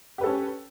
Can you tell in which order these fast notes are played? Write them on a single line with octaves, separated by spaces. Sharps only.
G4 B4 A4 C#4